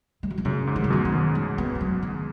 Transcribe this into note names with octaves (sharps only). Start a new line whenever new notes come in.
G#3
F#3
D#3
F#2 C#3
G#2
D#3
F#3
F#2 B2 D#3
D#3
F#2 B2
G#3
B3
G#3
F#3
D#3